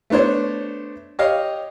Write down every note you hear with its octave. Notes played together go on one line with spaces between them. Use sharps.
A3 B3 D4 C5 C#5
G4 C#5 D#5 F5